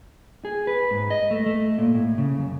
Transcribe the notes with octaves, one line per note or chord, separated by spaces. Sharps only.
G#4
B4
G#2
D#5
A3
A3
A#2
A2
C#3
F#2